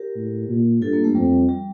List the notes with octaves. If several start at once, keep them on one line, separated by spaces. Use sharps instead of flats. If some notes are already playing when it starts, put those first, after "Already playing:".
Already playing: G4 A#4
A2
A#2
G2 F4 A4
A#3
A3
F2 G3
G3